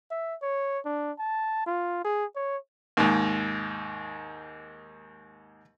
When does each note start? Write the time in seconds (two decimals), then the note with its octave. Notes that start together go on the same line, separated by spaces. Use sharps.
0.11 E5
0.42 C#5
0.85 D4
1.19 A5
1.66 F4
2.04 G#4
2.36 C#5
2.97 D#2 G#2